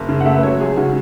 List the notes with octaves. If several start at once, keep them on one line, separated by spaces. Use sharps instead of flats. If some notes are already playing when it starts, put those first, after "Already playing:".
Already playing: F#1
C#3
F#5
A3 E5
B4
F#3 C#5
C#2 G#4
C#3 F#4